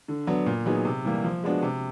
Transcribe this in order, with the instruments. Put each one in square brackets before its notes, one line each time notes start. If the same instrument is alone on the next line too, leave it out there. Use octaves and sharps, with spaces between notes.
[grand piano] D3
F#3 B3 D4
A#2
F#3 B3 D#4 G#4
C3
E3 G3 A#3
F3
G#3 B3 D4 F#4
C3